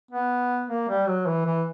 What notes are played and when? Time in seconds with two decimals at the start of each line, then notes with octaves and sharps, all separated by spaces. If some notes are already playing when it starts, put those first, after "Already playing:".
0.11 B3
0.68 A#3
0.89 G3
1.07 F#3
1.26 E3
1.46 E3